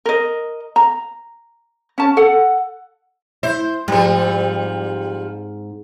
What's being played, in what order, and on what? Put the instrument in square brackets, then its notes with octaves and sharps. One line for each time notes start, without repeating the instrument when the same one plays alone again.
[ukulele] A#4 D#5
A#5
C#4 A5
A4 F#5
[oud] E4 [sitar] C5
[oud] G#2 C4 [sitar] F3 G3